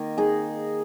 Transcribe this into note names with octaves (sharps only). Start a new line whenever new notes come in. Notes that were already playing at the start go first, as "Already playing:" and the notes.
Already playing: D#3 A#3
D#4 G#4